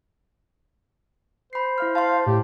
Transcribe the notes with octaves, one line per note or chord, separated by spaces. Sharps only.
C5 B5 C7
E4 F5 F6
F5 A5 C6
A2 G4